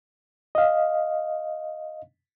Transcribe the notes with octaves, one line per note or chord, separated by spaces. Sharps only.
D#5 F5